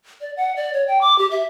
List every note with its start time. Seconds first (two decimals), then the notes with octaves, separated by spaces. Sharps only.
0.21 D5
0.37 F#5
0.56 D5
0.73 C#5
0.87 G5
1.01 D6
1.18 G4
1.31 E5